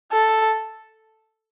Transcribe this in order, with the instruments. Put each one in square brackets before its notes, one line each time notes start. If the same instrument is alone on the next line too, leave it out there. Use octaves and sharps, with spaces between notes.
[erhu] A4